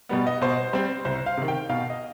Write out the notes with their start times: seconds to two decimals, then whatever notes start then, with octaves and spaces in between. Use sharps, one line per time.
0.09 B2 G3 B3
0.26 D#5
0.42 B2 C5
0.73 G3 C4 C5
1.05 C2 C5
1.26 F5
1.37 C3 D#3
1.48 G5
1.69 B2 F5
1.90 D#5